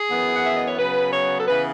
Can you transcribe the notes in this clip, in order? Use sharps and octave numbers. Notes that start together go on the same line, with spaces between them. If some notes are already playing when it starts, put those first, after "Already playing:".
Already playing: G#4
F#2 E3 B3
F#5
E5
D#5
C#5
C#3 F#3 B3 B4
C#5
A4
C#3 E3 B3 B4